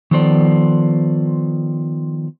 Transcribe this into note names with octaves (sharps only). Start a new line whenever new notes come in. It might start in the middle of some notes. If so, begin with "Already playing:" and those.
D#3 F3 B3 A4 C5 D5